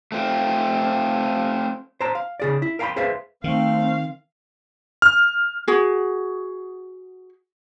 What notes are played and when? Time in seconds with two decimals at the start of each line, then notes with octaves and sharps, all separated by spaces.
0.12 A3 C4 F4
2.01 C5 A5 A#5
2.15 F5
2.40 C#3 G#4 D5
2.62 E4
2.79 A#4 F5 G5 A5 B5 C6
2.96 G#4 B4 C5 E5 F5
3.44 D#3 A3 C4 F5
5.02 F6
5.68 F#4 G#4